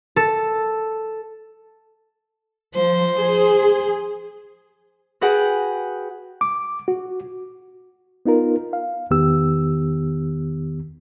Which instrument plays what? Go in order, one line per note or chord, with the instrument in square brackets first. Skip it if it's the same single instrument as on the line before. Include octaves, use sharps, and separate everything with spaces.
[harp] A4
[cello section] F3 [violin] C5
[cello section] G#4
[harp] F#4 G#4 B4 F#5 G5
[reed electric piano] D6
F#4
B3 D#4 F4 A#4
F5
E2 D#3 B3 G4 E6